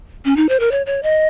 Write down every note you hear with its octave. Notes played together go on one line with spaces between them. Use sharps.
C#4
D#4
C5
A#4
C#5
C#5
D#5